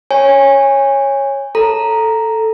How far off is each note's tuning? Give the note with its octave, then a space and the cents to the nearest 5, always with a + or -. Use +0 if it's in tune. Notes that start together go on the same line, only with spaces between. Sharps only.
C#5 -10 G#5 -20
A4 +0 A#5 +0